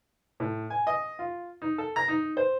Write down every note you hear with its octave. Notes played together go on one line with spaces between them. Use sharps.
A2
G#5
D#5
F4
D#4
A4
A#5
D#4
C5